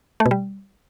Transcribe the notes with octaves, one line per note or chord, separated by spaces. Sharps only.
A3
B2
G3